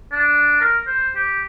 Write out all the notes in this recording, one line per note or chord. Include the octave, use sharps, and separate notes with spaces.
D4
A#4
C5
G4